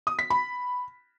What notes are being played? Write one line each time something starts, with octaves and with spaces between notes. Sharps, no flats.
D#6
B6
B5